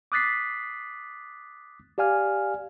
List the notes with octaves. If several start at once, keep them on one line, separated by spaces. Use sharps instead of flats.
D6 D#6 F#6 A6 B6 C7
G4 D5 F5 G#5 F6